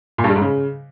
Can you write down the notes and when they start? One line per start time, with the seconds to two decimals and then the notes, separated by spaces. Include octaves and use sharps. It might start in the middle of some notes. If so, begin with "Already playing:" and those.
0.18 A#2
0.24 G2
0.30 G3
0.36 G#2
0.41 C#3